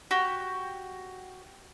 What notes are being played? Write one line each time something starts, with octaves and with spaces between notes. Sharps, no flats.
F#4 G4